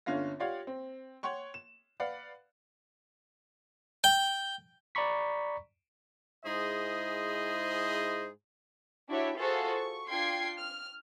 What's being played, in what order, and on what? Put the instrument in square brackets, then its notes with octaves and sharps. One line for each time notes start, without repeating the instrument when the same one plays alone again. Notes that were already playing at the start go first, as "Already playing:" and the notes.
[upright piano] G1 D3 C#4 F4 F5 A#6
F4 G4 C#5 D5 F5 F#5
C4
C#5 F#5 G5 C6 C#6
E7
B4 D5 F5 F#5 B5
[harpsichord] G5
[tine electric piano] D5 A#5 B5 C#6 B6
[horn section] G#2 E4 G#4 C5 D#5
[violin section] D4 E4 F#4 G4 C#5 E5
F4 F#4 G#4 A4 C5
C#6
D4 F4 G5 C6 G#6 C7
F6